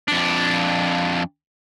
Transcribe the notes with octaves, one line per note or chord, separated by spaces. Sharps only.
F2 D4